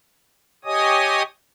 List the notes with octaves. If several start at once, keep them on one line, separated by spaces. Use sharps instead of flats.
G4 C#5 D#5 G#5 D#6